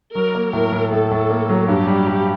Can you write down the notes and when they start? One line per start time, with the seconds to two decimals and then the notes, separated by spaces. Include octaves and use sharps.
0.15 F#3 A#4
0.35 A#3
0.53 A2 A#4
0.72 A2
0.92 A2 A4
1.11 A2
1.30 A#3
1.49 F#3
1.68 G2 G4
1.87 G3
2.07 G3